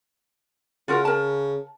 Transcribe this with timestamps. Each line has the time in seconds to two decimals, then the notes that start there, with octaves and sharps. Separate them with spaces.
0.88 C#3 F4 F#4 A#4
1.05 A#4 A5